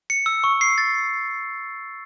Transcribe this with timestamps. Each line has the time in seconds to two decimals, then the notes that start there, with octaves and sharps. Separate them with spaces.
0.10 C#7
0.26 E6
0.44 C#6
0.61 C7
0.78 A6